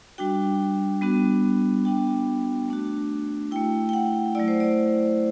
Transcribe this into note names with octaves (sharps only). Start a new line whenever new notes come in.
G3 D4 F#4 G5
G3 B3 D4 F#4
B3 D4 F#4 G5
A3 D4 F#4
A3 E4 G5
G5
F#5
F#3 A3 E4 D5
C5
D5